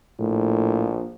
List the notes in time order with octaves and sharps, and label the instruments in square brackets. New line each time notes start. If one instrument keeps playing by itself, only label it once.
[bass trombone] A#1 [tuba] A2